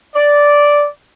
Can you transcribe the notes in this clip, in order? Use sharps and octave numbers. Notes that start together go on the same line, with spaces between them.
D5